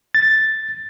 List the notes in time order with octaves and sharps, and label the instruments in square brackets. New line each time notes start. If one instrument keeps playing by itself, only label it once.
[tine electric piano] A6